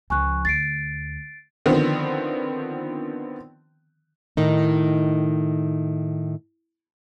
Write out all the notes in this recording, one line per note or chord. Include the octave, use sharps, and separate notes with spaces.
C#2 F3 G#5 C#6 F#6
D2 A6 C7 D7
D3 D#3 F3 B3 C4
A2 D#3 D#4